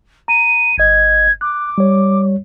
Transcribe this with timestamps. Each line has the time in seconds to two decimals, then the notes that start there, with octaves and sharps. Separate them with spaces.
0.28 A#5 D#7
0.78 G1 D#5 G#6
1.41 D6 F#6
1.78 G3 C#5